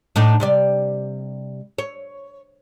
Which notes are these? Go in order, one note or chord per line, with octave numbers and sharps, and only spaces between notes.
A2 D4 D#4
C3 G3 D5
C#5